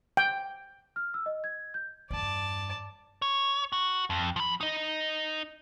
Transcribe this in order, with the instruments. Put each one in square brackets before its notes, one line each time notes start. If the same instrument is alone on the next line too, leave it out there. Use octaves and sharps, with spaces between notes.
[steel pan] G5
[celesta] F6
E6
D#5
G#6
G6
[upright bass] E2 G2 [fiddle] D5 A5
[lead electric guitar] C#5
F#4
F2
F3 B5
D#4 D#5